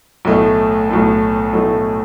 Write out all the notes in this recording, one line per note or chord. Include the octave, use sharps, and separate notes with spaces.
B1 A2 A3
B1 A2 A3
B1 A2 A3